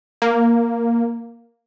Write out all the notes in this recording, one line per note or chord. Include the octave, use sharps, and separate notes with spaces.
A#3